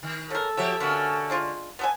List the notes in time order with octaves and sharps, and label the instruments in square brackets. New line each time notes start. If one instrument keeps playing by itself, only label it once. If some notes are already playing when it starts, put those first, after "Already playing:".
[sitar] D#3
[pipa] C#3 A#4 [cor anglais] A4
[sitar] F3 G4 E5 [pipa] F#3
[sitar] D3 C#4 [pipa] A#3 F#4 B4
[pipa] G#3 D4 F4
B3 A4 G#5